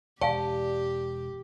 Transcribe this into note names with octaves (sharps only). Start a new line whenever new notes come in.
E1 G4 D5 F5 G#5 A5